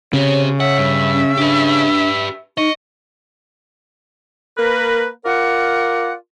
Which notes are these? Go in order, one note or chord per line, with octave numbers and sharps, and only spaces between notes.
C#3 C4 G4 C#5
C#5 E5 F#5
G2
C#4
D4 G4 B4
D#4 D#5 C#6
A#3 A#4 B4
F4 A#4 D5 F#5